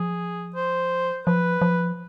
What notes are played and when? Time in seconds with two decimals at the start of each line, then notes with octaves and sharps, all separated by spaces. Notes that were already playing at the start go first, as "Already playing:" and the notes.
Already playing: F3 G#4
0.55 C5
1.26 F3 B4
1.61 F3